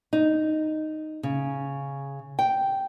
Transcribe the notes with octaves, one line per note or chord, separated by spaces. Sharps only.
D#4
C#3
G5